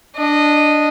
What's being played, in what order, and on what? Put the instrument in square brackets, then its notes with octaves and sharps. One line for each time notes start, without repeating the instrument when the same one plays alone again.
[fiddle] D4 D#5